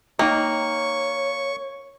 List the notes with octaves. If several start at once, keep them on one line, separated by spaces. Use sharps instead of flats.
A#3 D#4 C#5 D#5 G5 C#6